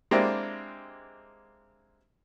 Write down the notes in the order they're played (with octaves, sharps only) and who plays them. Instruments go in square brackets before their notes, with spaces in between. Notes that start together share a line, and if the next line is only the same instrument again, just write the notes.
[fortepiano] G#3 A#3 C4 D4 E4 G4